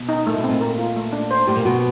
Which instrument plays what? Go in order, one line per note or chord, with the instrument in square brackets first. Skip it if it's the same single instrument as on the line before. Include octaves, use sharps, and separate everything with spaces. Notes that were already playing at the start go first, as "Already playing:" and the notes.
Already playing: [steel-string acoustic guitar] B2
[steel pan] D#4
[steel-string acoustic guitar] A#2 [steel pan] A3
[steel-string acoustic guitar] B2
[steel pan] C4
[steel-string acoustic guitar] A#2
[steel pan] A#4
F4
A3
D4
C5
[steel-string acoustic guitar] A2 [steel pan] G4
[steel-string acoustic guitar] A#2
[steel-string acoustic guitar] B2 [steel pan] F#4